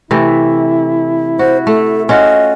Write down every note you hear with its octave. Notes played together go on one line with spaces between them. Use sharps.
C3 E3 A3 E4
F#4 C5
A3 A4
C#4 F4 F#4 D#5